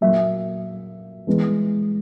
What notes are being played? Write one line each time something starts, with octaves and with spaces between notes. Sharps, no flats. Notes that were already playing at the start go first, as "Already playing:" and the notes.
A#2 F#3 A#3 E5
E3 G#3 B3